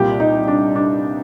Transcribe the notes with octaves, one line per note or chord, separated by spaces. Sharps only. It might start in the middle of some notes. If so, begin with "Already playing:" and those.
Already playing: C2 A#2 G3 G4
D#4
D4
D4